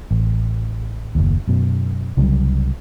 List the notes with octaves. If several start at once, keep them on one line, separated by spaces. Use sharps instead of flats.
A1
F#1 D#2
F#2 B2
C2 C#3 F#3 G3